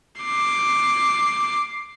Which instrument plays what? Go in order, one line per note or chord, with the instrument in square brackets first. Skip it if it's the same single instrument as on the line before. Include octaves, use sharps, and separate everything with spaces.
[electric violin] D6 C7